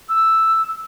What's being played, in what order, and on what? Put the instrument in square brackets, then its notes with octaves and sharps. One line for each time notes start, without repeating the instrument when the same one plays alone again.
[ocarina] E6